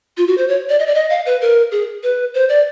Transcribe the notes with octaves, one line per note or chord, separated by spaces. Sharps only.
F4
F#4
C5
C#5
D5
D#5
D5
D#5
F5
B4
A#4
G#4
B4
C5
D5